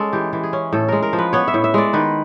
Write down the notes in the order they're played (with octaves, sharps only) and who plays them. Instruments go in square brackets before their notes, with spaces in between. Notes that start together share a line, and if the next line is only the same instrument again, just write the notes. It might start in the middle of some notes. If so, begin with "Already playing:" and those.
Already playing: [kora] G#3 C#4 A4
E3 G4
E3
G#4
C#4
A2 A4
G#3 A#4
A#4
F3
B4
B3 C#5
E5
A2
E5
G#3 D5
D#3 B4